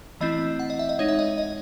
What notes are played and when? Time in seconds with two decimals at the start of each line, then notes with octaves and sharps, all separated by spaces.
0.21 E3 A3 C4 E4 D#5
0.59 F#5
0.70 D#5
0.79 E5
0.89 D#5
0.99 G#3 D#4 C#5
1.08 E5
1.19 D#5
1.38 D#5